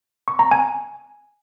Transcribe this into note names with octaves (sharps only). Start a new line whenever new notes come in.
C#6
A#5
G#5